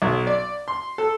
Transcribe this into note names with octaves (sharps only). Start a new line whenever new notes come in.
B1
D5
C6
A4